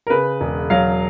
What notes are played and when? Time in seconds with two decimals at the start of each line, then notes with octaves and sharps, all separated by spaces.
0.07 A#4
0.10 C#3 B4
0.40 E1
0.70 F#3 F5